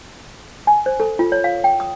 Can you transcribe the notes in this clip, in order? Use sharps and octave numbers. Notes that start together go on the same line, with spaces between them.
G#5
C5
A4
F4
C#5
F5
G5
D#6